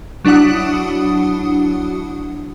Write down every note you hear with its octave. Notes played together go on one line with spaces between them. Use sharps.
F#3 D4 E4 F#4 F#5 D#6